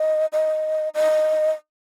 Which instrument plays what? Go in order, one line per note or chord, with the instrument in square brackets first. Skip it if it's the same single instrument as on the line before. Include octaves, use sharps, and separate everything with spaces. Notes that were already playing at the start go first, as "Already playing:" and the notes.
Already playing: [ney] D#5
D#5
D#5